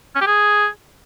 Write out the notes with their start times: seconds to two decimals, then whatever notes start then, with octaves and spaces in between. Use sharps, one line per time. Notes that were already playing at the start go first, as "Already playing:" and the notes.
0.15 C#4
0.21 G4
0.27 G#4